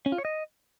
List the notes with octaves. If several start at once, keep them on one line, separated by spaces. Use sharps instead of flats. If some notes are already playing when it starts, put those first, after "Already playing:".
C#4
F4
C#5
D#5